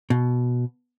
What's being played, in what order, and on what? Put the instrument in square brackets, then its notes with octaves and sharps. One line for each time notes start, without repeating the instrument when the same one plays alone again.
[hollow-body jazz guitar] B2